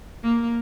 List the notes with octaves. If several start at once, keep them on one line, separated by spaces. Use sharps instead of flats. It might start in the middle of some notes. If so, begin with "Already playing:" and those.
A#3